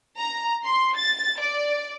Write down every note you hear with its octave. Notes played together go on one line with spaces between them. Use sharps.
A#5
C6
A6
D5